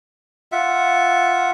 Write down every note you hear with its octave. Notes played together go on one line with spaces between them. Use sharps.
F4 E5 F#5